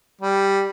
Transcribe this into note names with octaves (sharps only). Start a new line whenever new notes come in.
G3